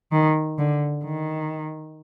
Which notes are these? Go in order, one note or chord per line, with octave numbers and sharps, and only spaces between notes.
D#3
D3
D#3